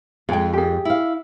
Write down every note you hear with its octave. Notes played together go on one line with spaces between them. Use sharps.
F2 G#3 G#4 G5
G4 G#4
E4 F5